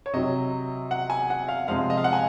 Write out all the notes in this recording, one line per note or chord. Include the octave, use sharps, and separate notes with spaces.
C#5
C3 F#3 D#5
F#5
G#5
F#5
F5
C3 F3 G#3 F5
D#5
F5
F#5
G#5